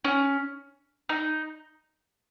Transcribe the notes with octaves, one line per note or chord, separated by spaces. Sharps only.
C#4
D#4